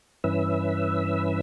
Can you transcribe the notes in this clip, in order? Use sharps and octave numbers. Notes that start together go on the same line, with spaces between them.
G2 E3 C#4 B4 E5 E6